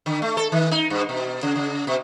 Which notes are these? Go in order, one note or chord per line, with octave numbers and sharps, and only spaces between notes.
D3
A3
A4
D#3
D#4
G2
B2
C#3
C#3
B2